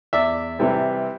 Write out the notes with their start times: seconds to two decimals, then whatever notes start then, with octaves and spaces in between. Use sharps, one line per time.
0.13 E2 D5 E5
0.59 C3 E3 G3 C4